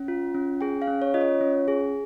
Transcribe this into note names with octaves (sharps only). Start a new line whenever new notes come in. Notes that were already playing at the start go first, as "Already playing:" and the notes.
Already playing: C#4
F4
C#4
G#4 G5
F5
C#4
C#5
F4 D#5
C#5
C#4
G#4